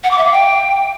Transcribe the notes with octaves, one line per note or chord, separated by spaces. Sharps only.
F#5
D6
E5
F5
G5